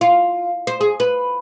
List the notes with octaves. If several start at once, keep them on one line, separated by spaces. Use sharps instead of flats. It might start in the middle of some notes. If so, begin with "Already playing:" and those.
F4
C5
G#4
B4